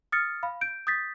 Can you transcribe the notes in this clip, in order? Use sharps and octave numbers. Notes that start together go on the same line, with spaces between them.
D#6 F6 A6 C#7
F5 B5
G6 D7
D#6 G6 A6 B6